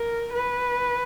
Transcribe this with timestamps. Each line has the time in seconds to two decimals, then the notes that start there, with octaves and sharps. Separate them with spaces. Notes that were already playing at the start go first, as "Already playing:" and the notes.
Already playing: A#4
0.33 B4